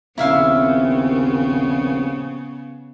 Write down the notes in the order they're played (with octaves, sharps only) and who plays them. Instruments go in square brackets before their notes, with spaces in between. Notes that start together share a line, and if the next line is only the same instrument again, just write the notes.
[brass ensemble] A#1 D#2 C4 [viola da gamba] C#3 B3 [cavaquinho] E4 E5 F5